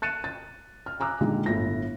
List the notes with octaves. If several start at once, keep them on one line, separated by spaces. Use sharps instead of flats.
F#6 A6 C#7 D#7 E7
A6
F6
G#5 A#5 D6 E6 F#6
A#2 D3 D#3 G#3 G#4
G1 A2 E4 A#6